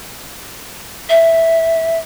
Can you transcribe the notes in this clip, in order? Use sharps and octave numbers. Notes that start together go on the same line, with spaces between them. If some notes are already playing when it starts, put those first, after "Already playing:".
E5